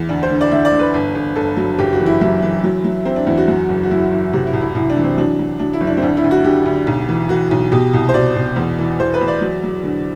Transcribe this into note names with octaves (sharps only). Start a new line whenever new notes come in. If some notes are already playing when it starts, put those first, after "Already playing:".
Already playing: E2
D2 D4
C5
D3
D5
D3 E5
D5
D3
B4
G1
G1
G1 A4
F#3
F#1 G4
F#4
E3
E4
F#2 E4
E3
F#3
F#3
F#3 C4
D4
E2 E4
F#4
F#2
F#1
F#4
F#3 E4
F#1
C3 F#4
E4
C2
E4
C2 E4
D4
E3
C4
F#3 D4
F#3
F#3 D4
E4
F#1
D4
C4
D2 D4
E4
D2
F#4
D3 G4
D2
B1
E3
E3 F#4
B1
B2 G4
C2
C5
B2 D5
B2
E2
E3
E2 C5
B4
E2
D5
F#3
F#3
D3